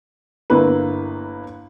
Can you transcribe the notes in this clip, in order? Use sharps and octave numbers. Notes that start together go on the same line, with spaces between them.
G1 A#3 E4 B4